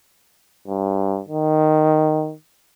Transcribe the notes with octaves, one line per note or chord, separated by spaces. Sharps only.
G2
D#3